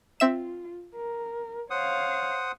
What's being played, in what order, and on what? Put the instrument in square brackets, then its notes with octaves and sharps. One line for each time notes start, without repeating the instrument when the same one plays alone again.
[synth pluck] C4 E5 E7 [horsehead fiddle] F4
[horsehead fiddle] A#4
[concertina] C5 F#5 D#6 [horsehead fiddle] C#5 F5